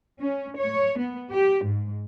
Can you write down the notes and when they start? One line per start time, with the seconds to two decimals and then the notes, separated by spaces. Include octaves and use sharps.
0.20 C#4
0.57 C#5
0.99 B3
1.31 G4
1.64 G#2